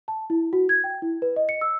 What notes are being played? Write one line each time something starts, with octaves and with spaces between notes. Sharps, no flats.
A5
E4
F#4
G#6
G5
E4
B4
D#5
C#7
E6